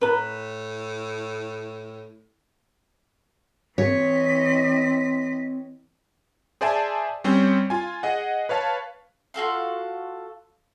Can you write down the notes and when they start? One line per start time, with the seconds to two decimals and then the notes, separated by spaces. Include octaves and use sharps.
0.01 A2 B4 A#5 B5
3.78 E3 C4 C#5 D#5 B6
6.61 G#4 C5 D5 E5 G#5 A5
7.24 G3 C4 C#4 C5
7.70 F4 G#5
8.03 G#4 D#5 F#5
8.49 B4 C#5 F5 A5
9.34 F4 F#4 A4 F5